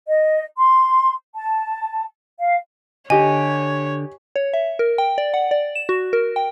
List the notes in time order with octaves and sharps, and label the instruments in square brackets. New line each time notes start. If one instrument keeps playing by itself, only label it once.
[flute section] D#5
C6
A5
F5
[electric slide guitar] D3 [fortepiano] G4 D#5 [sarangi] C#5 [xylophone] G#5
[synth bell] C#5
E5
A#4
G5
D5
F#5
D5
E7
F#4
A#4
G5